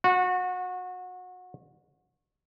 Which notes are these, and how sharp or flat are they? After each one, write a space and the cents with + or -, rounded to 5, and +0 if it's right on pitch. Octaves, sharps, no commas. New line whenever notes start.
F#4 -25 F#5 -10